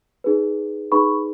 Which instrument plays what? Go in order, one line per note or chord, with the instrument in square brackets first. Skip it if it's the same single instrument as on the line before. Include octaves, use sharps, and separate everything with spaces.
[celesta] D#4 G#4 B4
D#4 G#4 B4 B5 C#6